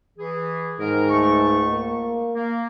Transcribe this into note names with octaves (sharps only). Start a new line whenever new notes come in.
E3 G#4
G#2 D#3 A#4
C#2 A3 C#6
A#3
A#3